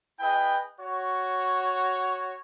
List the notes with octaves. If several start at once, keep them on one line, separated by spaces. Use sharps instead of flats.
E4 G#4 B4 D#5 G5
F#4 C#5